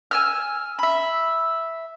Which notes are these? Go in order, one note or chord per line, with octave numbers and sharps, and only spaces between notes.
G#5 E6 F6
E5 B5